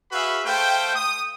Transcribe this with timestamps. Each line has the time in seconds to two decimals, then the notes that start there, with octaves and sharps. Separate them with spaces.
0.12 F#4 G#4 B4 E5 F5 B5
0.46 A3 C5 F5 G5
0.96 D#6